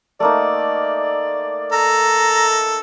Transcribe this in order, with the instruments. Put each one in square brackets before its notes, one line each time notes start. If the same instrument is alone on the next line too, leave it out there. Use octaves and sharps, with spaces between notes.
[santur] A3 A#3 D#4 [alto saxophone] D5
[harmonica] A4 [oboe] A#5